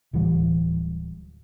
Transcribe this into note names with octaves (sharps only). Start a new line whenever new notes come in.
D1 E3 G3